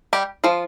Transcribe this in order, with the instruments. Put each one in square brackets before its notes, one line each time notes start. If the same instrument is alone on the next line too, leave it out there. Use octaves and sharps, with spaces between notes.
[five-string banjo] G3 G4
F3 F4